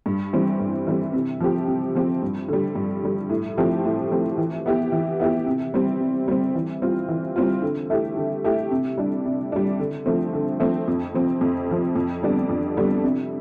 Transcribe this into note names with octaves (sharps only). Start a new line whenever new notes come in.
G2
E3 G3 C4
G2
E3 G3 C4
C3
F3 C4 G4
C3
F3 C4 G4
G2
D3 G3
G2
D3 G3
A2
F3 A3 C4 G4
A2
F3 A3 C4 G4
E3
B3 E4 G4
E3
B3 E4 G4
C3
G3 C4
C3
G3 C4
E3
G3 C4 F4
E3
G3 C4 F4
D3
A3 E4 G4
D3
A3 E4 G4
C3
G3 D4
C3
G3 D4
D3
F3 A3 C4
D3
F3 A3 C4
F2
C3 F3 C4
F2
C3 F3 C4
F2
D3 G3 B3 D4
F2
D3 G3 B3 D4
C3